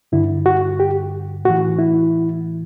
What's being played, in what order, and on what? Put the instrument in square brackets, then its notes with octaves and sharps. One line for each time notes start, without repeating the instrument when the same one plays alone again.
[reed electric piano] G2 D3 E4
F#4
G4
A2 E3 F#4
E4